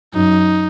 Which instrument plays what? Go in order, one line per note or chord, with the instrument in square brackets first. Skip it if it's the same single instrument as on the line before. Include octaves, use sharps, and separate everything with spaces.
[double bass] F#2 [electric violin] D#4